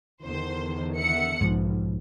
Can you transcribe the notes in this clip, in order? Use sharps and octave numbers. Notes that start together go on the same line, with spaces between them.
E2 D3 D#3 C5
E5 F#5 C#7
B1 G#2 F3